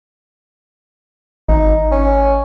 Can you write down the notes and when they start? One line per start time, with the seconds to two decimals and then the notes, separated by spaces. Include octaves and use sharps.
1.49 G#1 D#4
1.91 C#4